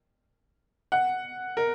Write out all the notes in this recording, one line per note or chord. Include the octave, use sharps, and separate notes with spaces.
F#5
A#4